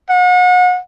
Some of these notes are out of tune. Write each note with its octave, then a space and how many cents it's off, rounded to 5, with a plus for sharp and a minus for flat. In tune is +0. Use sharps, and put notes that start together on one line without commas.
F#5 -35